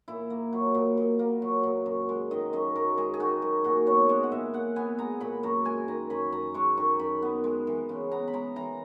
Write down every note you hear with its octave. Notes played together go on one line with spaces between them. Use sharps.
A#2 E4
A#3
F#3
A#2
A#2
A#3
F#3
A#2
F#2
G#3
D#3 D#5
F#2 D#5
F#2 A#4
G#3 G#4
G#4
D#3 F#4
F#2
A#2 F#4
B3 C#5
G#3 D#5
F#5
A#2 E5
A#2 F#5
B3 G#5
G#3 A#5
A#2 B5
F#2 A#5
G#3 G#5
D#3 A#5
F#2 B5
F#2 A#5
G#3 C#6
D#3 C#6
F#2 B5
B3
G#3
E3
C#3
B3 A#5
B5
G#3 A#5
E3 A#5